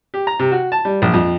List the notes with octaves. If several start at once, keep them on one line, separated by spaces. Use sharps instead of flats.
G4
A#5
C3
F#4
A5
G3
A#1
F2